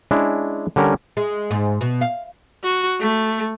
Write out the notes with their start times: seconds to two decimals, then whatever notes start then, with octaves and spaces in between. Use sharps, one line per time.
0.11 G#3 C#4 D4 E4
0.76 D3 G3 C#4 A#4
1.17 G#3
1.51 G#2
1.81 B2
2.01 F5
2.64 F#4
3.00 A3